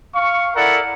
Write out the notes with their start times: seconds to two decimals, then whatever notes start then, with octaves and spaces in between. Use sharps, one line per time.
0.15 F5 C#6
0.55 E4 A4 A#4 D5 F#5